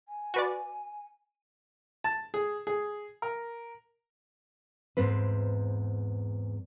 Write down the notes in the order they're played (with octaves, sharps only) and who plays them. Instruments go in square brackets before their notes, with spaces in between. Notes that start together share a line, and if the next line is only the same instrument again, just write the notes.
[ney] G#5
[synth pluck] F#4 B4 D5
[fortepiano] A5
G#4
G#4
A#4
[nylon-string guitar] E2 G#2 C4 B4